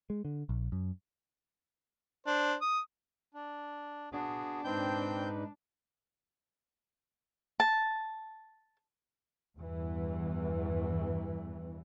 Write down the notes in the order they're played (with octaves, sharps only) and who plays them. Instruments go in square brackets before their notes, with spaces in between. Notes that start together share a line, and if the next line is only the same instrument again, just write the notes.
[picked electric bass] G#3
D3
A#1
F#2
[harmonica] D4 C5
D#6
[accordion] D4
[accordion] B3 F#4 G#4 [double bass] D4
[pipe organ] G#2 D#4 B4 [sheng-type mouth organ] C4 G6 [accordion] G5
[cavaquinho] A5
[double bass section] E2 G2 E3